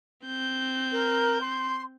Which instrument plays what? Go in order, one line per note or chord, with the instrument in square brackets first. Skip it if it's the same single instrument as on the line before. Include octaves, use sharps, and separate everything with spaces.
[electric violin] C4 G6
[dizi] A#4
C6